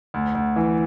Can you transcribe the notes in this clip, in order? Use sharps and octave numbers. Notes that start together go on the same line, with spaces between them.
D2
D2
E3